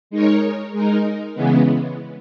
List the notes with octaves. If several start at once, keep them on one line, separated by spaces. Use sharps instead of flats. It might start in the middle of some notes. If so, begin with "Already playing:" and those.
G#3 D#4 A#4 C#5
G#3 D#4 A#4
C#3 E3 G#3 B3